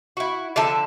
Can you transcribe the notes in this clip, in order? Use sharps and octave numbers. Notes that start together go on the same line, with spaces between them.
E4 F#4
D3 F3 E5 A5